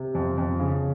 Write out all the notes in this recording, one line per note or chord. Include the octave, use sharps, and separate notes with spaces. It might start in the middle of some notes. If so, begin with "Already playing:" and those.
Already playing: C3
F2
F2
C#3